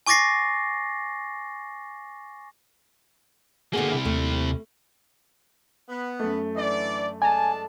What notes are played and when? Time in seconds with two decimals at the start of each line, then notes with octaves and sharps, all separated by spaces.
0.06 G#5 C#6 D6 A6 A#6 C7
3.73 D3 A#3 B3 F#4 G#4
3.91 C3 E4
4.05 D#2 A3
5.89 B3
6.19 F#2 A3
6.56 D3 E3 D5
7.22 G#3 D5 G#5 A5